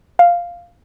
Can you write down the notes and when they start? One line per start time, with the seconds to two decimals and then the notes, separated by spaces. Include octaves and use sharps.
0.19 F5